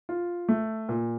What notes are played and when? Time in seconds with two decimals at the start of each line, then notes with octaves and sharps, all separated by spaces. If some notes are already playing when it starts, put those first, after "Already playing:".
0.09 F4
0.49 A3
0.89 A#2